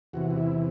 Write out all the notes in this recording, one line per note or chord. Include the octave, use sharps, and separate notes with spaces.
E2 C3 E3 F#4
F#4
E4